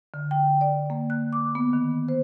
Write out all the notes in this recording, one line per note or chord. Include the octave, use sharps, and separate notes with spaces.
D3
G5
D5
A#3
F#6
D6
B3
D#3
C5